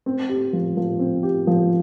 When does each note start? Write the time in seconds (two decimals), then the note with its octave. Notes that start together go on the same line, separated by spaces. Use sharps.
0.06 C4
0.29 G4
0.53 F3
0.77 F3
0.99 C4
1.23 G4
1.47 F3